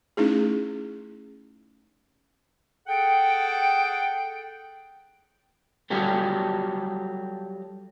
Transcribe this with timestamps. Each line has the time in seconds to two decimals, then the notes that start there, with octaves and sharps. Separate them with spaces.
0.17 A3 C#4 D#4 E4 G#4
2.87 G#4 A4 F#5 G5
5.90 F#3 G3 F4 G4 A4